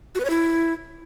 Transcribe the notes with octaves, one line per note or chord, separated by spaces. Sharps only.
F#4
B4
C#5
E4